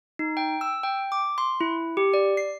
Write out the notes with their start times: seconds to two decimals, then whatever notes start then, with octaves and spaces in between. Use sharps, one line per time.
0.19 D#4
0.37 G5
0.61 E6
0.83 G5
1.12 D6
1.38 C6
1.61 E4
1.97 G4
2.14 D5
2.37 C7